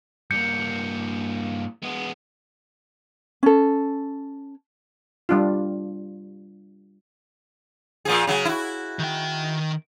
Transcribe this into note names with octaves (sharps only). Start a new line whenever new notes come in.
G2 A#3 G6 C#7
G#3 B3
C#4 A4
G3 D4 F4
A#2 F3 G#4
C#3 F#3
E4 F#4
D#3 G5